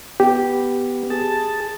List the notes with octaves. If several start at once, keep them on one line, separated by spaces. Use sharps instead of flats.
B3 G4
G#4 A5